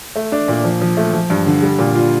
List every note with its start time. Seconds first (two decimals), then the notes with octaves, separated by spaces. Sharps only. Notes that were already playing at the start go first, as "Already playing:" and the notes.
0.16 A3
0.32 D4
0.48 A#2
0.64 F3
0.81 F3
0.97 A3
1.13 F3
1.30 G2
1.46 D3
1.62 G3
1.79 A#2
1.95 F4